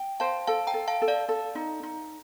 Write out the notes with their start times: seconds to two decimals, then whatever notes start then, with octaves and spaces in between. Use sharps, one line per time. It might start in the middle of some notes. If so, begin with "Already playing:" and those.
Already playing: G5
0.20 C5 F5 A5
0.47 A4 F5 A5
0.67 G5 A#5
0.74 A4
0.88 F5 A5
1.02 A4
1.08 D5 F5
1.29 A4
1.55 D#4
1.83 D#4